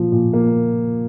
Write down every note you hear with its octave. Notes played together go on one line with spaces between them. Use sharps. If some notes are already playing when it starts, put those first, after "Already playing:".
Already playing: A#2 F3
A#2
A#3